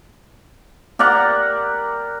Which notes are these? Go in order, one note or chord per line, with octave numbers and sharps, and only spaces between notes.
G4 A#4 D5 F#5